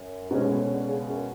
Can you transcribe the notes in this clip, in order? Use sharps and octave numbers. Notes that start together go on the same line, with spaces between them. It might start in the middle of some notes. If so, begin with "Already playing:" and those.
Already playing: F#2
G#2 B2 G#3 C#4
A2
C#3
D3
C#3
F#2